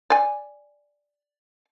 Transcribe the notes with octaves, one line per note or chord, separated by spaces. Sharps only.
D5 G#5